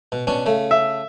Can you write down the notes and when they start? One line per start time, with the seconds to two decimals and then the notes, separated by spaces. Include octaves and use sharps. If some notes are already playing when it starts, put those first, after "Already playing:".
0.12 B2
0.27 B2 C#4 D4
0.46 C#3 A3
0.71 E5